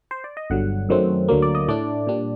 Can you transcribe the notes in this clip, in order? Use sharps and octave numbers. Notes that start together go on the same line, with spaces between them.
C5
D5
D#5
G1 G2 D3 F#3 F#5
F#2 D#3 F#3 A3 C4
D2 D3 F#3 A#3
D5
D#5
A2 A3 D4 D5
A#2 G3 D4